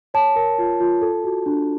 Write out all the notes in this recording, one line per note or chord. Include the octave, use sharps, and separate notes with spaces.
C#5 A5
A#4
F4
F4
A4
F#4
D4